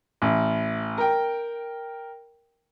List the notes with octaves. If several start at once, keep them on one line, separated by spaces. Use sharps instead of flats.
A1
A#4 G5